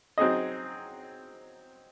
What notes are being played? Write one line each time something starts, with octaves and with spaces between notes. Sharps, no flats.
F#3 C4 D#4 G#4 D#5